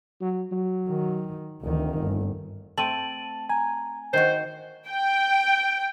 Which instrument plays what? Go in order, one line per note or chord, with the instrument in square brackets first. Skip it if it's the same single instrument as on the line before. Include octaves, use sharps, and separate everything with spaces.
[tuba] F#3
F#3
[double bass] D#3
[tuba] F1 [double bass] D2 D#3
[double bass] G1
[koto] A3 C4 [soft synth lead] A5 [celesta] D7 D#7 F#7
[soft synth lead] G#5 [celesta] A#5
[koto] D#3 F#4 [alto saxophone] C5 [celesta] D#5 C7
[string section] G5